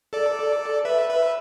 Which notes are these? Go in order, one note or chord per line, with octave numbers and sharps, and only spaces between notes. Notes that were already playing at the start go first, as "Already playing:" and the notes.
A4 D5
B4 E5
B4 E5